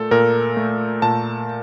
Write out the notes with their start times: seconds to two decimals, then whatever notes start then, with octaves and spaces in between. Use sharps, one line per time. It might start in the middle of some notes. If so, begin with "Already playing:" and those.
Already playing: A#2 A3 A4
0.11 A#2 A#4
0.57 A3
1.02 A#2 A5